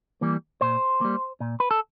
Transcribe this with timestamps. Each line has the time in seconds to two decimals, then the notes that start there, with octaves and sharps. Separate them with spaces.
0.21 E3 G3 A#3
0.61 A#2 C5
1.01 G3 A#3
1.40 A#2
1.60 B4
1.71 A4